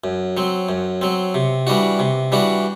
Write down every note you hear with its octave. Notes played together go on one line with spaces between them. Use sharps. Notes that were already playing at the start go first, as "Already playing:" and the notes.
F#2
F#3 C4
F#2
F#3 C4
C3
E3 G3 D4 F#4
C3
E3 G3 D4 F#4